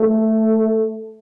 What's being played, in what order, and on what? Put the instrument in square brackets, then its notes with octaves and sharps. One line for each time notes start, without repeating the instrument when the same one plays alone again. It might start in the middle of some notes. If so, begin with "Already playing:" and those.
Already playing: [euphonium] A3